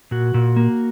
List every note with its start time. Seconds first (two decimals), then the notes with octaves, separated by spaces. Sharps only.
0.11 A#2 F#4
0.34 A#2
0.57 A#3